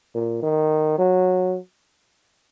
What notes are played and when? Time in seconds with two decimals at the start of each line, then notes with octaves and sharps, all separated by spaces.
0.15 A#2
0.43 D#3
0.98 F#3